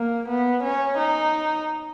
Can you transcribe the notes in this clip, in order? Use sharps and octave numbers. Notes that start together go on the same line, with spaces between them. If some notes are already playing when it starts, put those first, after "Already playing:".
Already playing: A#3
B3
C#4
D#4